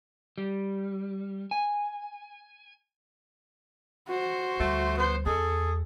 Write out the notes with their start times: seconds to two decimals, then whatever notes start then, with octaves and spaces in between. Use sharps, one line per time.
0.38 G3
1.51 G#5
4.08 F#4 C5
4.60 D2 G3 A3
4.97 B3 C5
5.26 E2 G#4 A4